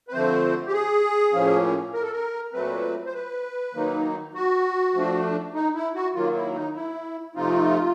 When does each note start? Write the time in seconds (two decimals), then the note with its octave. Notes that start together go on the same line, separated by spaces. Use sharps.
0.08 B4
0.12 D3 F3 A3 C4 C5
0.67 G4
0.72 G#4
1.33 A2 F3 A#3 C#4
1.93 A#4
2.02 A4
2.12 A#4
2.53 A#2 F#3 A3 C4 B4
3.06 C5
3.14 B4
3.74 D#3 F#3 A#3 D#4
4.34 F#4
4.94 F3 A3 D4
5.55 D#4
5.75 E4
5.95 F#4
6.14 D#3 F#3 A#3 F4
6.35 E4
6.55 D#4
6.74 E4
7.35 C3 F3 A3 C4 D#4 F4